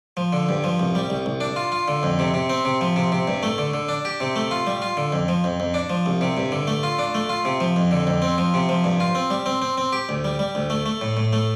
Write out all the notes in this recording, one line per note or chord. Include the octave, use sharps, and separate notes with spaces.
F3
D3
G2
F3
C2
G3
C2
C2
D4
F4
F4
D3
F2
C3
C3
C4
C3
F3
C3
C3
G2
A3
D3
D3
D4
G4
C3
A3
F4
G3
F4
D3
F2
F3
F2
F2
D4
F3
C2
C3
G2
D3
A3
F4
D4
A3
F4
C3
F3
F2
D3
F2
C4
F3
C3
F3
G2
F4
C4
G3
C4
C4
C4
G4
D2
G3
G3
D2
A3
A3
A2
A2
A3